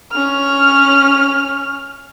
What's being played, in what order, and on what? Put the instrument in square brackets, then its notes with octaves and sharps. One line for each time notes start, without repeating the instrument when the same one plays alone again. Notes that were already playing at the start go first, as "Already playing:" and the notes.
[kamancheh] C#4 F6